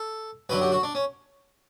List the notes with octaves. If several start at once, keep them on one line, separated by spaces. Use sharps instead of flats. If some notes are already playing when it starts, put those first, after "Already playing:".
Already playing: A4
F#2 D3 F#3 B4
G4
F#4
D4
C#4